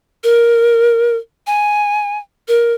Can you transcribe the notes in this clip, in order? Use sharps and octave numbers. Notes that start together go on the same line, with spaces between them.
A#4
G#5
A#4